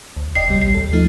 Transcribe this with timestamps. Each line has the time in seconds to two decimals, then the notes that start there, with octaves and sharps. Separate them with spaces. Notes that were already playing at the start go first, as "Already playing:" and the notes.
0.17 D2
0.35 E1 D5 D#5 G5 C7
0.48 C#2 C3 G3
0.61 A1 C7
0.74 D#2 A4
0.93 F3 A3 D#4